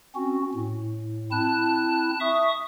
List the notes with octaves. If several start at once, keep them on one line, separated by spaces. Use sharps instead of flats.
C4 C#4 F#4
A2
C4 E4 A5 F#6
E5 C#6 D#6